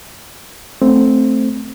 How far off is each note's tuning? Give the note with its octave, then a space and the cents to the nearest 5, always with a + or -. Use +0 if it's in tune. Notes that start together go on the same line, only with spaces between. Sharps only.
A3 +0 C4 +0